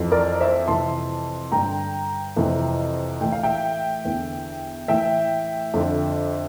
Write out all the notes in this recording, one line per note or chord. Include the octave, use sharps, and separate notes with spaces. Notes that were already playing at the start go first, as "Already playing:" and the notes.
Already playing: F2 E3
A#4 D5
C5 E5
F2 C3 E3 A5 C6
G2 D3 G5 A#5
F2 C3 E3
A2 E3 G5
F5
E5 G5
E2 D3
A2 E3 E5 G5
F2 D3